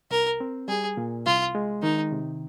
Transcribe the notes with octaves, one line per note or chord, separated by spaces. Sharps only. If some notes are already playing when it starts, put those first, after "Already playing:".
C2 A#4
C4
G3 G#4
A#2
C2 F4
G#3
D#3 D#4
C3